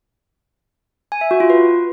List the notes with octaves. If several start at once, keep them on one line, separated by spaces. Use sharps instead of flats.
G#5
E5
F#4
F4
B4